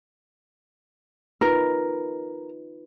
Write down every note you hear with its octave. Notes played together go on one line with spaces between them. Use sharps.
D#4 F4 A#4 B4